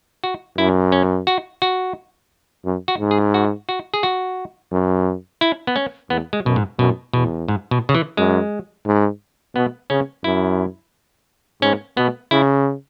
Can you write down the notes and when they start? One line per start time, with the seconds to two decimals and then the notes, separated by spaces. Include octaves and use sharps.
0.24 F#4
0.58 F#2 E4
0.92 C#4
1.27 F#4
1.62 F#4
2.65 F#2
2.88 F#4
3.00 G#2
3.11 G#4
3.34 F#4
3.69 F#4
3.94 G#4
4.03 F#4
4.72 F#2
5.41 E4
5.67 B3
5.76 C#4
6.10 E2 B3
6.33 G#3
6.45 F#2 B2
6.56 G#2
6.79 F#2 B2
7.14 E2 B2
7.48 G#2
7.71 B2
7.89 C#3
7.95 E3
8.17 F#2 G#3
8.86 G#2
9.55 B2 B3
9.90 C#3 C#4
10.24 F#2 E4
11.62 G#2 C#4
11.97 B2 B3
12.31 C#3 E4